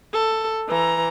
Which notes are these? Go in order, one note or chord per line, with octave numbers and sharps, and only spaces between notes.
A4
E3 A#5